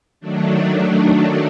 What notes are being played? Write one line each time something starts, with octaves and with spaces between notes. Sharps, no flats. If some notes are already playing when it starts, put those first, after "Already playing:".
D#3 F#3 A3 D4